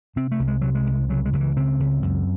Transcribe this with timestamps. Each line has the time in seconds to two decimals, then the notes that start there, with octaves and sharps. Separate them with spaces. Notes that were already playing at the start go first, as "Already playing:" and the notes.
0.16 C3 C4
0.31 A3
0.39 C2
0.48 G#3
0.62 C3 F#3
0.75 G#3
0.87 C2
1.09 C#3 F#3
1.25 G#3
1.33 C#2 F#3
1.40 E3
1.57 C#3 C4
1.80 C#2
2.02 F#2